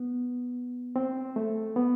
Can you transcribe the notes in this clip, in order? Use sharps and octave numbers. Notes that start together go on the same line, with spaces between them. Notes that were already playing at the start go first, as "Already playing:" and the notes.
Already playing: B3
C4
A3
B3